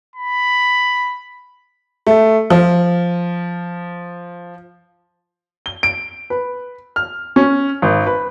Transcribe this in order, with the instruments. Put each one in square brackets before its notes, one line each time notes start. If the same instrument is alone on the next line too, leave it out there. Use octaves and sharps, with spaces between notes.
[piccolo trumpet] B5
[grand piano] A3
F3
[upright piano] G7
D7
B4
F6
C#4
G#1
B4